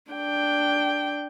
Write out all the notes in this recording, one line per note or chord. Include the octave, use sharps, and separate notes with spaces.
D4 G5